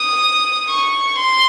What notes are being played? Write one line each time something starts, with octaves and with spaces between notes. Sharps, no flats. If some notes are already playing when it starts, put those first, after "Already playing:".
Already playing: D#6
C#6
C6